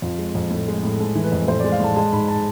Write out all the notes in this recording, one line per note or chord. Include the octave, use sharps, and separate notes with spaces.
F2 F4
G#3
F2
A2
G#3
A2
G#3 A4
E3
B4
F2
A2 C5
D5
G#3
F5
A2 A5
G#3 A5
G#2 B5
A5